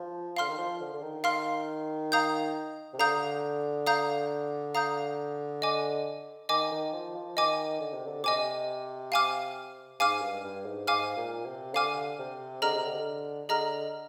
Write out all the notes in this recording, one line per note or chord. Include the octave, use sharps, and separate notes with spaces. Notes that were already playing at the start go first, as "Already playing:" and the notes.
Already playing: F3
D3 F5 C6 F6
D#3
F3
D3
D3
D#3
F5 C6 F6
F5 A#5 D#6 G6
C3
D3 F5 A#5 D#6 G6
F5 A#5 D#6 G6
F5 A#5 D#6 G6
D#5 G#5 D6
D#3 D#5 G#5 D6
D#3
F3
F3
D#3 D#5 G#5 D6
D3
C3
D3
C3 D#5 G#5 D6
F5 G#5 D6 F6
G#2 F5 G#5 D6 F6
G2
G2
G#2
G#2 F5 G#5 D6 F6
A#2
C3
D3 F5 G#5 D6 F6
C3
D3 G#4 D#5 A#5 F6
C3
D3
D3 G#4 D#5 A#5 F6